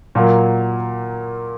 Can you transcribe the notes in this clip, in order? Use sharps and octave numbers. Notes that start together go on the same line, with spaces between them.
A#2 F#3 A#3